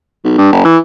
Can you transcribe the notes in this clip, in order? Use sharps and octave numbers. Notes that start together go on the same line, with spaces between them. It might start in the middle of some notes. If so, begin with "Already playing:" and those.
B1
G2
F#1
E3